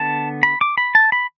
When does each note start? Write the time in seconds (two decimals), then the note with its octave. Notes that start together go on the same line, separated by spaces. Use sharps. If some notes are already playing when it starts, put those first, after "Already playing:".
Already playing: D3 B3 A5
0.43 B5
0.61 D6
0.78 B5
0.95 A5
1.12 B5